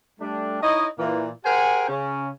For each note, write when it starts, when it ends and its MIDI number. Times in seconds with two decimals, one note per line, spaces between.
0.20 0.58 55
0.20 0.58 57
0.20 0.58 62
0.62 0.85 63
0.62 0.85 64
0.62 0.85 73
0.62 0.85 75
0.98 1.29 46
0.98 1.29 52
0.98 1.29 58
1.45 1.88 67
1.45 1.88 68
1.45 1.88 70
1.45 1.88 72
1.45 1.88 78
1.45 1.88 80
1.89 2.29 49
1.89 2.29 61